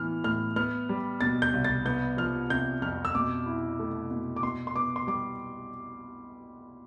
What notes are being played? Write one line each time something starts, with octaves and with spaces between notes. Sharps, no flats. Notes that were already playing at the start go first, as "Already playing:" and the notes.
Already playing: A2 E3 B3 F6
A2 F6
B3 F6
G3
B2 A6
G6
C2
A6
B3 G6
F3 F6
C3 G6
F2 F6
E6
B2 D6
E4
A3
B2
D6
B2 C6
C6
B3 D6
C6
G3 D6